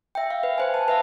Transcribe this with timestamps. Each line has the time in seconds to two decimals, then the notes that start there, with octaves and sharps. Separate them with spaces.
0.15 E5 G5
0.31 F5
0.43 B4
0.58 B4 C5 G#5
0.74 A5
0.88 B4 E5 F5